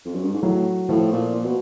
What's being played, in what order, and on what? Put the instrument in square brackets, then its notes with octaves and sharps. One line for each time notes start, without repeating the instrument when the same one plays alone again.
[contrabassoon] F2
F#2
G2
G#2
[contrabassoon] A2 [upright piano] F#3
[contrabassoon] A2 [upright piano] F3
[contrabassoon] A#2
A#2
B2